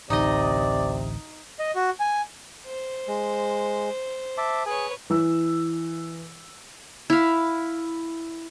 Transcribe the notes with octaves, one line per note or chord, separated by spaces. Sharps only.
A1 D2 C3 D#4 D5 D#5
D#5
F#4
G#5
C5
G#3
E5 A5 D6
G#4 B4 C#5 G#5
E3 E6
E4 F5